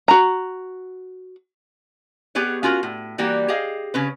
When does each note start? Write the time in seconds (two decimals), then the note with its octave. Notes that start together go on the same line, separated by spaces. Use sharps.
0.08 F#4 A#5
2.35 B3 G4 G#4 B4 C#5
2.63 C#4 F4 F#4 A#4
2.83 A2
3.18 E3 G3 A#3 F#4 G4
3.48 G4 G#4 D#5 F5
3.94 C#3 C#4 B4